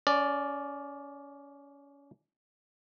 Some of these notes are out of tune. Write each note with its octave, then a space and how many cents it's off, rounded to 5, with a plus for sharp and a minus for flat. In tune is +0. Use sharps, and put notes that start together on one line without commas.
C#4 +25 D5 +0